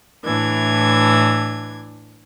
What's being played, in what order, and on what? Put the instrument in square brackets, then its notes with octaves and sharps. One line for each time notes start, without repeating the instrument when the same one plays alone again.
[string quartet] A2 E3 D4 G#6